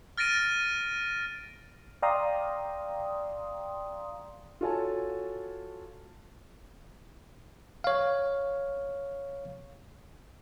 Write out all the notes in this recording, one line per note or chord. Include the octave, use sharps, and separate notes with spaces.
F6 A6 A#6 D7 D#7
D5 F5 G5 A#5 C6 D#6
F4 F#4 A4 C#5 G#5 A5
C#5 F5